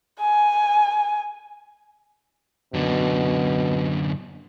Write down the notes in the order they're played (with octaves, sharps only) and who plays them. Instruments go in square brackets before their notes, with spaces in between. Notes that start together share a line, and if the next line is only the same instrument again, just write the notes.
[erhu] G#5
[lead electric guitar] F#2 D3 [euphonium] B2